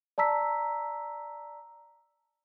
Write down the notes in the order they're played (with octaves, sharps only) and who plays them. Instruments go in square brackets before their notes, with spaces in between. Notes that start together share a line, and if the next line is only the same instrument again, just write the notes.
[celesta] D5 A5 A#5 E6 B6